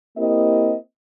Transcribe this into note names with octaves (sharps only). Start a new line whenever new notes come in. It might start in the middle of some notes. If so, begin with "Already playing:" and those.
A#3 C4 E4 G4 A#4 D#5